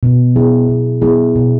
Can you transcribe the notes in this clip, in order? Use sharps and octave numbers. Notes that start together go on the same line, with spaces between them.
B2
F#3 B3 E4 G#4
B2
F#3 B3 E4 G#4
B2